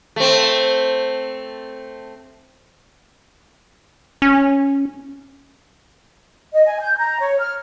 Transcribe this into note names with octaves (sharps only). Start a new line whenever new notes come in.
A3 C4
C#4
D#5
G#5
G6
A#5
C#5
F6